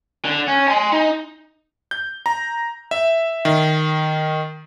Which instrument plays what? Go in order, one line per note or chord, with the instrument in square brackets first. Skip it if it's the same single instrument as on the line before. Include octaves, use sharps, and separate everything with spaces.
[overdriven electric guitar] D3
C#4
G#5 C6
D#4
[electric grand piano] G6
A#5
E5
D#3